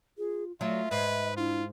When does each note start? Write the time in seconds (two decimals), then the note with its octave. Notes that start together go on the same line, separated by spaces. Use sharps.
0.18 F4 G#4
0.61 F#3 A3 F4 E5
0.91 G#2 B4 D#5
1.37 D4 E4 F4